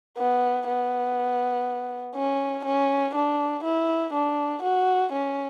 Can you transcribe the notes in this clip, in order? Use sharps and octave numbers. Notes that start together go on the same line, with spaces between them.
B3
B3
C#4
C#4
D4
E4
D4
F#4
C#4